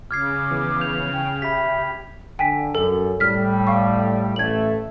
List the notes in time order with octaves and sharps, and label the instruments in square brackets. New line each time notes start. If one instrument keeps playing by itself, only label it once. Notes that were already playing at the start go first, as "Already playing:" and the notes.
[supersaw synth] C#3 [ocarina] D6 [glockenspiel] F6 G#6 C7
[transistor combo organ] E3 B3
[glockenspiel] G6 F7
[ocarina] G5
[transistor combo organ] G4 [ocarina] E5 [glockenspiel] B5 B6
[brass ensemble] D3 [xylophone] G5 G#5 B6
[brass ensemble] F#2 [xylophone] A4
[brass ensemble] A2 G3 [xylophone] F6 B6
[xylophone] F5 C#6
[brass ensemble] A1 A2 A3 [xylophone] G#6 F#7